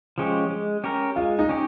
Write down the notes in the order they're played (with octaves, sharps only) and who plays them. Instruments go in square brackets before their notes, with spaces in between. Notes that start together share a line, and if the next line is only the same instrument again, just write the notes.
[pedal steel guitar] F3 G#3 C#4 G4
G#3
C#4 G4 A#4
[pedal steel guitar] G#3 [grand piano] F4
[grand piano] D#4
[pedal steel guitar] C#4 G4